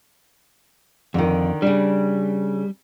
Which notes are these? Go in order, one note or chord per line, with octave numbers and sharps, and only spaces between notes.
F2 D3 D#3
C#3 G3 D4